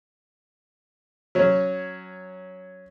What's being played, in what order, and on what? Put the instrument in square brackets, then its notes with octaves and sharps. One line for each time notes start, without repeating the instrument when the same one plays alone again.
[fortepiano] F#3 C#4